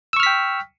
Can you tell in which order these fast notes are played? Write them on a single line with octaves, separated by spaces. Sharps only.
E6 C#6 F6 B6 G5